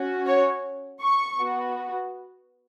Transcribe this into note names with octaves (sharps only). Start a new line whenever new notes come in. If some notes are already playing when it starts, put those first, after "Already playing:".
Already playing: C#4 F#4
C#5
C#6
B3 F#4